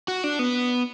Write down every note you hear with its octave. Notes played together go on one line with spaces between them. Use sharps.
F#4
D4
B3